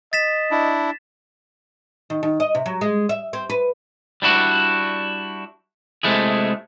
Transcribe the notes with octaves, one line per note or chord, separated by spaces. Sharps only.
D#5 A6 B6 E7
D4 E4
D#3
D#3
D#5
C3
F#3
G#3
E5
C4
B4
G3 D4 E4 F#4
C3 G#3 A3 E4 G#4